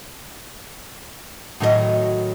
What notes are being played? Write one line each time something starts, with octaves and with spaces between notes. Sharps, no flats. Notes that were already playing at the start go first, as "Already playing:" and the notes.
A2 D#3 F#3 F#4 G#4 D#5